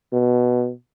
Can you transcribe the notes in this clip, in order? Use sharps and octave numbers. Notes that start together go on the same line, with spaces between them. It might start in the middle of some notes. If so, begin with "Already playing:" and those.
B2